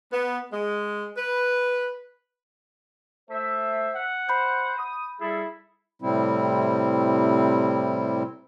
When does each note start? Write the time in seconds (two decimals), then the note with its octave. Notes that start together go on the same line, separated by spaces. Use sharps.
0.12 B3
0.53 G#3
1.17 B4
3.30 A3 C5 E5
3.96 F#5
4.29 C5 B5 G6
4.78 D#6
5.21 G3 E4 G#4 A4
6.02 A2 C3 G3 C4 E4